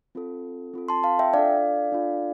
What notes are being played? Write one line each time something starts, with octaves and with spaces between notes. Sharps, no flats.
C4 F4 A4
C4 F4 A4
A5 C6
F5 A5
E5 G5
D4 F4 A4 D5 F5
D4 F4 A4